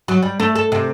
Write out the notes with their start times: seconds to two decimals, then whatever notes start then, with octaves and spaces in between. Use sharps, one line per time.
0.08 F#3
0.22 G3
0.40 A3
0.56 A4
0.72 C3